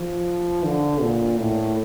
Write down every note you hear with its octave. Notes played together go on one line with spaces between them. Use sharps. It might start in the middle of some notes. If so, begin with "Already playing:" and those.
Already playing: F3
D3
A#2
A2